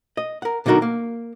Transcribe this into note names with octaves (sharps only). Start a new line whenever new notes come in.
D#5
A#4 F#5
B2 D3 F#3 D#4 F#4 A#4
A#3